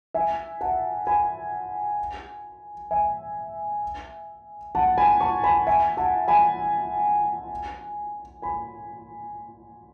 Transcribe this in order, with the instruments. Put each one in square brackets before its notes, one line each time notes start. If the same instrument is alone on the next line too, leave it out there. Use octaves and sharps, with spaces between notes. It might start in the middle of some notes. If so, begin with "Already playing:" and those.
[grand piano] E5 G#5
F#5 A5
G#5 B5
E5 G#5
F#5 A5
G#5 B5
A5 C#6
G#5 B5
E5 G#5
F#5 A5
G#5 B5
G#5 B5